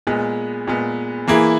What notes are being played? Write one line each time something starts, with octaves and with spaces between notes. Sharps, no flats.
A#2 G#3 B3
A#2 G#3 B3
E3 A#3 E4 G#4